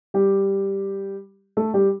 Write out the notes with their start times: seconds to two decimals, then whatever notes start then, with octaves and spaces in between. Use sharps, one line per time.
0.14 G3 G4
1.57 A3 A4
1.74 G3 G4